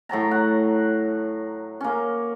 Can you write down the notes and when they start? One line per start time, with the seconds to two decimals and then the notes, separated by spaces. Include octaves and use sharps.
0.09 A2 F#3 A5 A#5
0.31 F#5
1.80 A#3 C#4